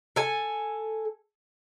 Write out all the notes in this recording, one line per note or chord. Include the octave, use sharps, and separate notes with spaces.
A4 G#5